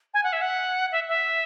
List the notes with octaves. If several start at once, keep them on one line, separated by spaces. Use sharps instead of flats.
G#5
F#5
E5
F#5
E5
E5